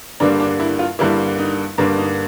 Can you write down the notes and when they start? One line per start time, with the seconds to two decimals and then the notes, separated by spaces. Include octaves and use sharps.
0.20 G2 D3 G3 A#3 D4
0.40 D4
0.60 E4
0.79 F4
0.99 G2 D3 G3 A#3 E4
1.39 D#4
1.78 G2 D3 G3 A#3 D4
1.98 D#4